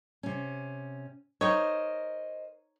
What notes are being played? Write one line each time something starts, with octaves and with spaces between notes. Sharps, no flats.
C3 C#4
D#4 A#4 C5 C#5 D#5